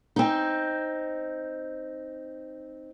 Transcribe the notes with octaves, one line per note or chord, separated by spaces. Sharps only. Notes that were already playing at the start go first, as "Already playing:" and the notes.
C4 D#4